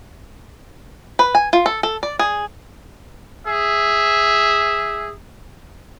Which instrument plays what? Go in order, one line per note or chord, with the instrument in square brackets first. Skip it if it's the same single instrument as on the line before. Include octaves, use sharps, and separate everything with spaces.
[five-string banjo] B4
G#5
F4
A4
A4
D5
G#4
[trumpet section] G#4 E5